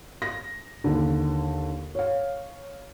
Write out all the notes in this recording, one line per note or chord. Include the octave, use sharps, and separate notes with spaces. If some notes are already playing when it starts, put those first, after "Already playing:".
A#6
D#2 D3
C#5 F5